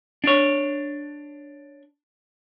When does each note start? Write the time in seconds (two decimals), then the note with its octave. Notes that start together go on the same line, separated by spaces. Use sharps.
0.24 D4 C#5